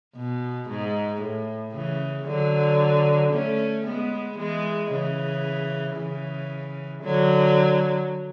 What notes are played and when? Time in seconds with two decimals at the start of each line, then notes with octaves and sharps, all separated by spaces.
0.16 B2
0.69 G#2
1.21 A2
1.73 C#3 E3
2.27 D3 F#3
3.32 A3 C#4
3.85 G#3 B3
4.38 E3 G#3
4.91 C#3 E3
5.96 C#3 E3
7.03 D3 F#3